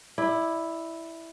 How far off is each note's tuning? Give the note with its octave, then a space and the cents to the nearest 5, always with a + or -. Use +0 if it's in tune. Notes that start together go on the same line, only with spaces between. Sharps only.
E4 +0 D5 +25